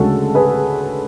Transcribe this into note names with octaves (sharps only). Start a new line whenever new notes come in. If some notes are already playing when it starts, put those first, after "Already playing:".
Already playing: D2 C#3 G#3 F#4 A4
G#4 B4